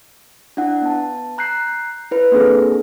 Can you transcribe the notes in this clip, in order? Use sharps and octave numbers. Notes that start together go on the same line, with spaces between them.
D4 E4 F#5
B3 A5
A#5 F#6 G6 C7
E4 B4
A#3 C4 D4 G#4 A4